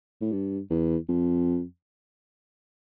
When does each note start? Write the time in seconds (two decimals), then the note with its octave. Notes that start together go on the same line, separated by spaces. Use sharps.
0.21 A2
0.32 G2
0.70 E2
1.08 F2